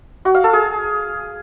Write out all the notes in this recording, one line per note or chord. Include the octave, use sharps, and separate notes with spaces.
F#4
F5
A4
G#4